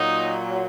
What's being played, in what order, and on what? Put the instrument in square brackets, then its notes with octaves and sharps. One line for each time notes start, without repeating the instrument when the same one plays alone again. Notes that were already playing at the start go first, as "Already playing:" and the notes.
Already playing: [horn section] A#2 F#3 D#4